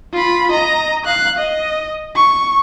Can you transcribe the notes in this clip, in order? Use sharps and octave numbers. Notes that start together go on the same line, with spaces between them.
F4 B5
D#5 A#5
F5 F#6
D#5
C#6